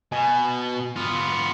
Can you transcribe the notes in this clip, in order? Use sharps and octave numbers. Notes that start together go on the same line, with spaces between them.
B2 G#5
B3 F4